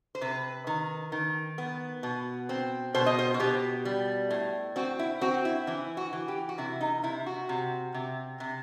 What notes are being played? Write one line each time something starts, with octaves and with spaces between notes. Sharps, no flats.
C5
C3 B4
D#3
D#3
B3
B2
C4
B2 C5
D#5
C5
F#4
B2 G4
G3
A2
C4 F#4
E4
C4 F#4
E4
E3 E4
F#4
E3
G4
F#4
C3 E4
D#4
C3 E4
F#4
C3
C3
C3